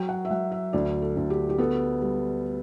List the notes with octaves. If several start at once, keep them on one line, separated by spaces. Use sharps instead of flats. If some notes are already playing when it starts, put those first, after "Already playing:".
Already playing: F#3 G5
F#5
E5
F#3 F#5
E5
D2 D5
A4
D2
G4
G4
B3 A4
G3